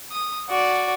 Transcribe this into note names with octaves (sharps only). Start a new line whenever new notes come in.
D#6
F#4 D5